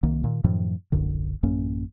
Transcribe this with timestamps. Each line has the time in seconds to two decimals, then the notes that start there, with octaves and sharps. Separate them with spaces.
0.03 C2 D#3 A#3
0.24 A#2 D#3
0.44 F#2 A2 D#3 F3
0.92 D1 A#1 F#2 D3
1.43 A1 F#2 A#3 C#4